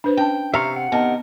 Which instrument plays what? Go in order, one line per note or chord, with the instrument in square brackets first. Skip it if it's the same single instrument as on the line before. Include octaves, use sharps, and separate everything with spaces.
[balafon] D4 B4 C5
[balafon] C#4 A5 [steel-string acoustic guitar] G5
[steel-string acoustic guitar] C3 F5 [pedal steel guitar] E5 A#5 C#6
[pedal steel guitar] F#5
[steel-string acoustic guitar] C3 D#3 A#4 [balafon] B3 A5